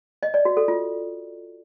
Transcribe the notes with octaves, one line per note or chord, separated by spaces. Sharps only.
D#5
D5
F#4
A4
F4